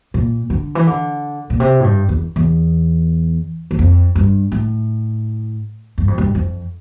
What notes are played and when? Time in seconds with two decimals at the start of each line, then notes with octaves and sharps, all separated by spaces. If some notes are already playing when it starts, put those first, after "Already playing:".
0.14 A#2
0.50 D3
0.75 E3
0.87 D3
1.50 A#2
1.60 C3
1.80 A2
1.84 G2
2.09 E2
2.36 E2
3.71 E2
3.79 F2
4.15 G2
4.52 A2
5.98 G2
6.08 F2
6.18 G2
6.35 F2